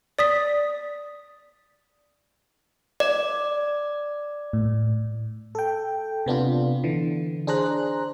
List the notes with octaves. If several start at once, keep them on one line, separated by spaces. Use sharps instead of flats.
D5 D#6 B6
D5
A2
A4 G5
C3 B3 D4 F4
D3 E3
D4 G#4 C5 A#5 F#6